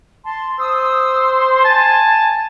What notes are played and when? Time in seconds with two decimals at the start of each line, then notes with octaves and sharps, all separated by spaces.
0.25 A5 C6
0.59 C5 D#6 E6
1.64 G#5 A5